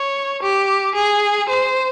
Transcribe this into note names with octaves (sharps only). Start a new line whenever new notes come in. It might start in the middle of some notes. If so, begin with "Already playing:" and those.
Already playing: C#5
G4
G#4
C5